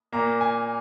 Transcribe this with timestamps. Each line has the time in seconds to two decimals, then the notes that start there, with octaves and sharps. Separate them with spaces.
0.12 A#2 A#3 A#5
0.41 G#5